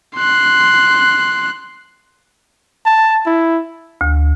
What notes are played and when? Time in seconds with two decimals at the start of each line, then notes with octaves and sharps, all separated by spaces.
0.16 C6 F#6
2.86 A5
3.26 E4
4.01 D2